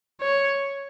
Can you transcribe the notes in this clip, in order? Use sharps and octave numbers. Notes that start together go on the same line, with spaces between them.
C#5